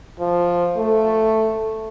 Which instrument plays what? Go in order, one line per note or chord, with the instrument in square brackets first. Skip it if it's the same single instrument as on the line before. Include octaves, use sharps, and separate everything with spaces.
[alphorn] F3
A3